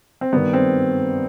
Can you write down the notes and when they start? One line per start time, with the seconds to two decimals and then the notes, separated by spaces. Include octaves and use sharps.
0.21 C4
0.33 G2 D#3 B3
0.53 C4